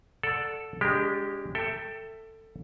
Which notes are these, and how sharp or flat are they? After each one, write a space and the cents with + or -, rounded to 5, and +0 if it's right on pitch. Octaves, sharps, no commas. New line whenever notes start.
A4 +0 D5 +0 F#5 -15
G#3 -20 D4 -35 G4 +0
A4 +15 E5 +5 G5 +0